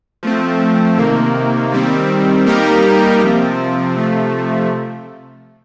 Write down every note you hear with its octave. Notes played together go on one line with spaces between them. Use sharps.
F3 A3 C4
C3 D#3 A#3
D#3 G3 C4
G3 A#3 D#4 G4 A#4
C3 F3 C4
C3 F3 A3